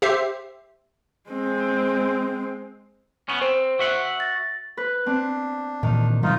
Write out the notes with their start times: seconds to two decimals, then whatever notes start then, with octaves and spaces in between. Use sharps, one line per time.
0.02 G4 C5 E5 C7
1.30 G#3 C4
3.28 B3 C#4
3.42 C4 C5
3.79 F#4 E5 F#5
4.20 A6 A#6
4.77 B4
5.06 C4 D4
5.83 A#2 D#3 E3
6.23 B2 D#3 F#3 G3 D#4 F4